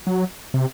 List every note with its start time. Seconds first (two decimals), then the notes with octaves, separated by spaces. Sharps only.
0.07 F#3
0.54 C3